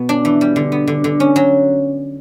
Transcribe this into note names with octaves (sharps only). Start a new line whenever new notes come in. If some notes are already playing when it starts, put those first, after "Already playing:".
Already playing: B2 B3
D4
E3
G3
D3
B3
D3
D3
C#4
F#3